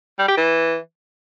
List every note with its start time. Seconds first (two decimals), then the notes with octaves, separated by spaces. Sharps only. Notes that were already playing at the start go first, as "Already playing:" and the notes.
0.19 G3
0.28 G4
0.38 E3